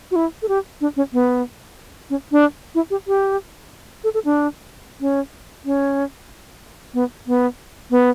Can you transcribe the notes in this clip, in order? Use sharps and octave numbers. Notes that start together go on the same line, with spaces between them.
F#4
E4
A4
G4
D4
C#4
B3
C#4
D4
E4
G4
G4
A4
A4
D4
C#4
C#4
B3
B3
B3